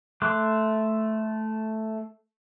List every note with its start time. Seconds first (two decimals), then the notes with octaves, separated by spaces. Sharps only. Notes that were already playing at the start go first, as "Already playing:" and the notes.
0.22 A3 C6 D6 F#6